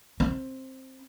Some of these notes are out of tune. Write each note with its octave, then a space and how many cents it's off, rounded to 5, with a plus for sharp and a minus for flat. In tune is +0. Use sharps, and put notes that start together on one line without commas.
C4 +10